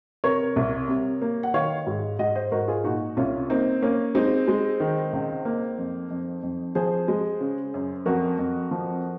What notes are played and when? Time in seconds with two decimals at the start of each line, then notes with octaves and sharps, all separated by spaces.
0.24 C3 A#4 C#5
0.56 C2
0.89 C3
1.22 A#3
1.43 F#5
1.54 D#3 C#5 F5
1.87 G#2
2.19 G#2 D#5 F#5
2.35 C5 D#5
2.52 G#2 F#4 A#4
2.68 F4 G#4
2.84 A#2 D#4 F#4
3.17 C2 C#4 F4
3.50 A#3 C4 D#4
3.82 A#3 C#4
4.15 G#3 C4 D#4
4.48 G#3
4.80 D#3
5.13 C#2
5.45 A#3
5.78 F2
6.10 F2
6.43 F2
6.75 F3 G#4 C5
7.08 G#3
7.41 C#3
7.74 F#2
8.06 F2 F#4 A#4
8.39 F2
8.71 F3